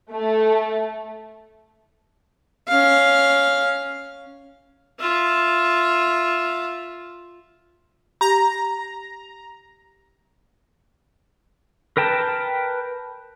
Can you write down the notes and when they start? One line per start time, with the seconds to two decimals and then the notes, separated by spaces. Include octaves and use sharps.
0.12 A3
2.68 C#4 F5
4.99 F4 E5
8.21 G4 A#5
11.97 A#4 B4 G5 A5